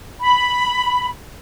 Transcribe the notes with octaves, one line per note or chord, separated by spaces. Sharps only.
B5